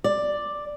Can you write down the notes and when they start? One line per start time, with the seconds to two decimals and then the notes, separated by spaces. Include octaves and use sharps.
0.04 D5